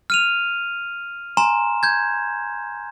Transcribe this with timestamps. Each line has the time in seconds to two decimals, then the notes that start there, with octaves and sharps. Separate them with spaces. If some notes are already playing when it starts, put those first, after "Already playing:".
0.10 F6 D#7 F7
1.37 G#5 A#5 C6 E7
1.83 G6 G#6